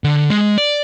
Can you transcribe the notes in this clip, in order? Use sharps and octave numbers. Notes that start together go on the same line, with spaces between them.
D3
G#3
D5